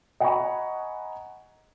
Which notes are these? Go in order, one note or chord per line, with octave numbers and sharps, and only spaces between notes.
D#5 F#5 G#5 A#5 B5 C#6